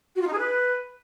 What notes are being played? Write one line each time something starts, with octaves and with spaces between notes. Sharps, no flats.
F#4
F4
D#4
G#4
B4